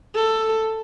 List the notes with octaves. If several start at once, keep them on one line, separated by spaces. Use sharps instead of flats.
A4